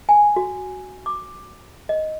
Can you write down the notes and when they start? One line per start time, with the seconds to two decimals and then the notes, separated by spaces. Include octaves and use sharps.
0.09 G#5
0.36 F#4
1.06 D6
1.89 D#5